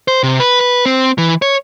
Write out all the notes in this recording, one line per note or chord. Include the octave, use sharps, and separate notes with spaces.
C5
C3
B4
B4
C4
E3
C#5